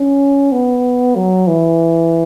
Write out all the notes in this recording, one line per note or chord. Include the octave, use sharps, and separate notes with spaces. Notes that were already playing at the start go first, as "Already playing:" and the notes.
Already playing: C#4
B3
F#3
E3